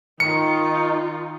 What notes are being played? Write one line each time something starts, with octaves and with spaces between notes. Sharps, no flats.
D#3 D#4 F4 C#7